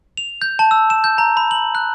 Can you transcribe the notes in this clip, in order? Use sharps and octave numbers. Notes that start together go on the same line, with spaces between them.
F7
G6
A5
E6
E7
G6
A#5
B5
F#7
F#6